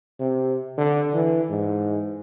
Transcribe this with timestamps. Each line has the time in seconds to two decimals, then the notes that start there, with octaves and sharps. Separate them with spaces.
0.20 C3
0.78 D3
1.14 E3
1.50 G#2